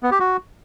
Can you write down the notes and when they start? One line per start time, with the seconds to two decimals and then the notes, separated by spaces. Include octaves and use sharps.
0.03 B3
0.11 G4
0.20 F#4